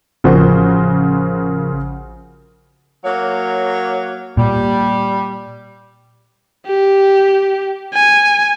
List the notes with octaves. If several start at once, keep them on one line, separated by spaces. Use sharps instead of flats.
A1 C#3 F3 F#4 A#4 C5
F#3 A#3 C#5
A#2 G3
G4
G#5